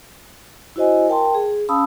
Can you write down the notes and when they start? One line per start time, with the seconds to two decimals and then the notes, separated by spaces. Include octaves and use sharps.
0.76 E4 F#4 C5 D#5 G#5
1.08 A#4 G5 A5 C6
1.35 G#4
1.69 C#4 F5 A5 B5 D#6 E6